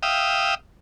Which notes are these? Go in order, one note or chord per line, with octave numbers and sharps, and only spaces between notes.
E5 F5 G5 D#6